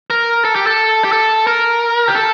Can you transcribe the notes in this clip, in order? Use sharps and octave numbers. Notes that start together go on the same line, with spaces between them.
A#4
A4
G4
A4
G4
A4
A#4
G4
A4